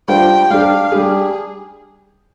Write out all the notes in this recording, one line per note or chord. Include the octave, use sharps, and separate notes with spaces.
G3 D4 F4 C5 G5
G3 D4 G4 F5
G3 D4 G4 G#4